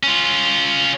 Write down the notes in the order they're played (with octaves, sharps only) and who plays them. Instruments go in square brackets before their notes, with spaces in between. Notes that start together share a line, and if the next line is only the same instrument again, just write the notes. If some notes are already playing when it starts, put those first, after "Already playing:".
[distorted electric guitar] C#4 F4